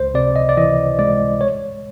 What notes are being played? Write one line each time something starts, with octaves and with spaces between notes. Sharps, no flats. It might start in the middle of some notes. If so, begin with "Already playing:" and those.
Already playing: C#2 C5
C3 D5
D#5
D5
E3 D#5
G#3 D5
C#5